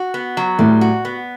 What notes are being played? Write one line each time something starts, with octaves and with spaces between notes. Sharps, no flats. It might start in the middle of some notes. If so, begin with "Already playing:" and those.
Already playing: F#4
B3
F#3
A2 G3
F#4
B3